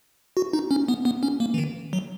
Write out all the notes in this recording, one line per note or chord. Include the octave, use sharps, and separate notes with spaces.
F#4
D#4
C#4
B3
B3
C#4
A#3
E3
D#3
F#3